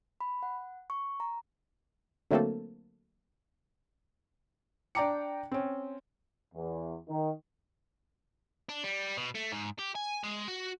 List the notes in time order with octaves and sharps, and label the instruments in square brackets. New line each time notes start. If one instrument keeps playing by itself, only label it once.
[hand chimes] B5
F#5
C#6
A#5
[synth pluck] D3 F#3 A3 A#3 C4 A4
[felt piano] D4 D5 G5 A#5 D6 C#7
C4 C#4
[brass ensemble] E2
D#3
[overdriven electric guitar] D4
G3
B2
A3
G#2
G4
G#5
G#3
F#4